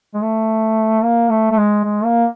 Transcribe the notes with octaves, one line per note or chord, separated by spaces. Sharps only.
G#3
A3
A#3
A3
A3
G#3
G#3
A#3